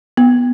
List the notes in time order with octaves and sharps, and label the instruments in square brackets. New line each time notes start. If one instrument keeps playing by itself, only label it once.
[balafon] B3